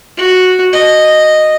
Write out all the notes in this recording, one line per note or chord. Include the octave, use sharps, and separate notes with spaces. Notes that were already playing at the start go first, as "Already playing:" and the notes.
F#4
D#5